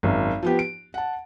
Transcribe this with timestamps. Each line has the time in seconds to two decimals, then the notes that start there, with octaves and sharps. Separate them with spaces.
0.03 G#1 F#2
0.42 F3 B3 G4
0.59 D7
0.94 F#5 A5